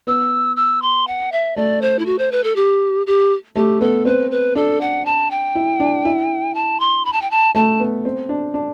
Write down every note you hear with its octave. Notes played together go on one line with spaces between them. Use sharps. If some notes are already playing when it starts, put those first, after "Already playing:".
B3 E6
E6
C6
F#5
E5
A3 D5
C5
E4
F#4
C5
B4
A4
G4
G4
A3 G4
B3 A4
C4 B4
B4
D4 A4
F#5
A5
G5
E4
D4
E4
A5
C6
B5
A5
G5
A5
A3 A5
B3
C4
D4
D4